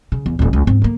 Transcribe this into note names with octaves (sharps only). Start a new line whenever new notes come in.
C#3
E2
D1 C#4
C#2
G#2 C4
D3 A#3